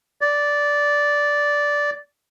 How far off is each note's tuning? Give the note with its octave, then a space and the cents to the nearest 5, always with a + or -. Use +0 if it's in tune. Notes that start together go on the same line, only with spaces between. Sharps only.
D5 -10